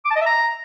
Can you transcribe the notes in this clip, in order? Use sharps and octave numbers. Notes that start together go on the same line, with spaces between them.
D6
A5
D#5
E5
A#5